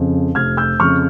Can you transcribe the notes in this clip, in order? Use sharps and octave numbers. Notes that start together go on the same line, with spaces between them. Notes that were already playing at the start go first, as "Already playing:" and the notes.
Already playing: F2 C#3
F1 F6 G#6
E6 G6
F2 C#3 C#6 F6